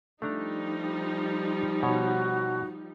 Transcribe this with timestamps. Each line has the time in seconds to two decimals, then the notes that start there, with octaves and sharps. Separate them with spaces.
0.22 F3 G3 A3 D4 D#4 A#5
1.83 B2 F#4 C#5